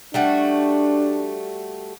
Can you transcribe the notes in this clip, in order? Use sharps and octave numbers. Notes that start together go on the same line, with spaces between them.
G3 A3 D4 F#4